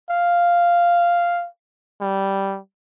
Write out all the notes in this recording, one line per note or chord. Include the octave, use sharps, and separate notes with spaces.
F5
G3